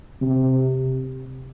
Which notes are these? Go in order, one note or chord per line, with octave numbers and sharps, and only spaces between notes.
C3